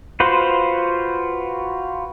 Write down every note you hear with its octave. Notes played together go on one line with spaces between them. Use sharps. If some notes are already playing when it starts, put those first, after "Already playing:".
F4 F#4 B4 C5